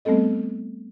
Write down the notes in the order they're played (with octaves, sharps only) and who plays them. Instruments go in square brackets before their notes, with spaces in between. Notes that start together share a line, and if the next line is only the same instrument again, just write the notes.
[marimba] G3 A3 B3 C4 A4 D#5